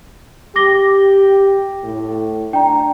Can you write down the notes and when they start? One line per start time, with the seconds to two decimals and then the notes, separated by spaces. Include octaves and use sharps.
0.56 G4 D6 A#6 G7
1.83 A2
2.53 D4 G5 A#5